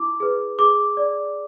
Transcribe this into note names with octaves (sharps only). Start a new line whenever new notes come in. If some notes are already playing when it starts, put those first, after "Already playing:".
Already playing: E4 D6
G#4 B4
G#4 D6
D5